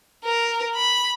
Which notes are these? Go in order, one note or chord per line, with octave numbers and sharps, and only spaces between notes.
A#4
B5